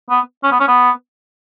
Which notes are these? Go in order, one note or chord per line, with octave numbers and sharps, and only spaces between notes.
B3
C#4
B3
C#4
B3